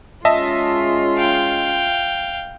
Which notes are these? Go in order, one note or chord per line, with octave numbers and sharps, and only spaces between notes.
G#3 C#4 F4 D#5 E5 A5
F5 G5